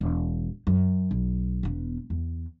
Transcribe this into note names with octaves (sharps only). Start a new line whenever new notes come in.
E1
F#2
B1
E1 B3
E2